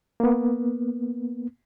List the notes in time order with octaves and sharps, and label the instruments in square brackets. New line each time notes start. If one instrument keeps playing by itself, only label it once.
[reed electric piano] A#3 B3